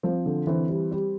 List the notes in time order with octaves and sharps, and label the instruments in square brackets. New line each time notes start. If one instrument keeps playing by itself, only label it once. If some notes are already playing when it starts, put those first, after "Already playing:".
[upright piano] F3 C4
D3
E3 C4
G3
G3